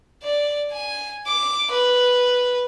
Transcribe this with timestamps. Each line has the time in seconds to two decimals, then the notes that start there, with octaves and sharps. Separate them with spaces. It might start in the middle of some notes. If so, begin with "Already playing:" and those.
0.23 D5
0.72 G#5
1.27 D6
1.71 B4